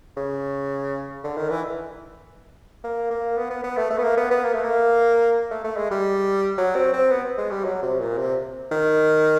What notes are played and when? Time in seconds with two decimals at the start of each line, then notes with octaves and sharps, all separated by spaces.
0.17 C#3
1.24 D3
1.37 D#3
1.50 E3
2.84 A#3
3.10 A#3
3.37 B3
3.50 B3
3.64 B3
3.77 A3
3.90 A3
3.98 B3
4.04 A#3
4.17 B3
4.31 B3
4.44 A#3
4.54 A3
4.63 A#3
5.51 A3
5.64 A3
5.77 G#3
5.91 G3
6.58 F#3
6.75 C4
6.93 C4
7.11 B3
7.38 G#3
7.51 G3
7.64 F#3
7.82 C3
8.00 A#2
8.18 C3
8.71 D#3